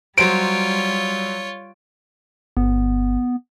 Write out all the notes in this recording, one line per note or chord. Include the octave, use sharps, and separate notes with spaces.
F#3 G3 F4 C5 C#5 D7
G1 B3